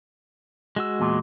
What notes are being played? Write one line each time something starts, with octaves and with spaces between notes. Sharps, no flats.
G#3 F#4 E6
E2 A#2